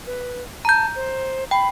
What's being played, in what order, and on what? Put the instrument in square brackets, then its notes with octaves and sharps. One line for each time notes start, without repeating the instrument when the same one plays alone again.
[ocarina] B4
[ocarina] A5 [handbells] A#5 G6
[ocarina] C5
[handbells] G5 [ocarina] B5